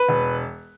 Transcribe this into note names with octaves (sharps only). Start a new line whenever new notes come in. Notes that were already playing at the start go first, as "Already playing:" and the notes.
Already playing: B4
E1